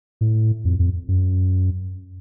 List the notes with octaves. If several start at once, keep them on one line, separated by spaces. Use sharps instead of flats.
A2
F2
F2
F#2